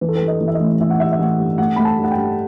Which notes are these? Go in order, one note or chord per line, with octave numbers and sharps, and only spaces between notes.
E3 B4
A4
B4
G2
D#5
E3
E5
D#5
A1
E3 E5
F#5
G3 E5
E5
A1 F#5
G2
A3 F#5
A3 B5
A5
G2
F#5
G5
G2